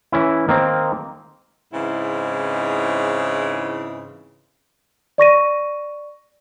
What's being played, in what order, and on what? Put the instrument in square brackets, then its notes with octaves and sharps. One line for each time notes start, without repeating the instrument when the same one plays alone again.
[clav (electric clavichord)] E3 C#4 E4
D#3 A#3 C4
[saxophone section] G#2 C#3 E3 C4 D#4 E4
[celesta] D5 C#6 A#6 D#7